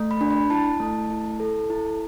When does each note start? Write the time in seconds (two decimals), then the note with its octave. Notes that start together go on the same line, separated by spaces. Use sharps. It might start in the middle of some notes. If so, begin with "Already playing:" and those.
Already playing: A3
0.11 B5
0.21 D4
0.31 B5
0.50 E4 A5
0.80 A3
1.10 E4
1.40 A4
1.70 E4